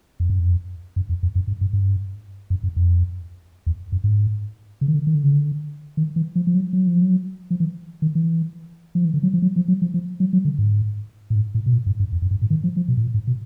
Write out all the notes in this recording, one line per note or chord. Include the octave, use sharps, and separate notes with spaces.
F2
F#2
F2
F#2
F2
F2
F#2
G2
G2
G2
F#2
F#2
F2
E2
F#2
G#2
C#3
D#3
D3
D#3
D3
C#3
D3
D#3
E3
F3
F3
F#3
F#3
F3
F#3
F3
E3
D#3
E3
F3
E3
D3
F#3
F3
F#3
F3
F#3
F3
F3
F#3
F#3
D3
G#2
A2
G#2
A2
B2
A#2
G2
G2
F2
F#2
G2
A2
D#3
F3
F3
B2
A2
A#2
G#2
B2